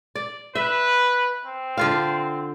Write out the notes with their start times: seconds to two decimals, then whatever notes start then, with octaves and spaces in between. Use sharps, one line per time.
0.15 D5
0.55 B4 E5
1.45 C4
1.78 D3 F4 F5